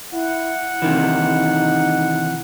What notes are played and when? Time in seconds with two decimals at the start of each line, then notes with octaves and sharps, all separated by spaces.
0.13 E4 F#5
0.82 C3 D#3 E3 D#4